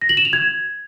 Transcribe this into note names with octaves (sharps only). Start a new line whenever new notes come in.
A#6
F#7
E7
F7
G#6